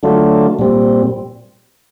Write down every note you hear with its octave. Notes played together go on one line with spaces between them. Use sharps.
D3 F#3 A3 D4 F4
A#2 G3 C4